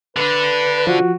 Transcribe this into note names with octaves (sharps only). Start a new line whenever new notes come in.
D3 D4 B4
F3 F#4